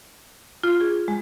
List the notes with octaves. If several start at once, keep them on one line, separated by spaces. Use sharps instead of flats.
F4
G#4
G#3